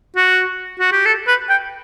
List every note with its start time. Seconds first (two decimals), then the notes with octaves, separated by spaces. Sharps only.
0.16 F#4
0.80 F#4
0.92 G4
1.06 A4
1.28 B4
1.50 G5